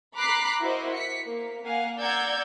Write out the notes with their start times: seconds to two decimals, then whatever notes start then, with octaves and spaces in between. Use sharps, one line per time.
0.16 A#5 B5 D6 F#6 B6 C7
0.61 E4 F#4 A#4 C5 D#5
0.93 B6 C#7
1.26 A#3
1.65 A#3 F5 F#5 G#5
1.98 D5 F#5 A#5 E6 G6 G#6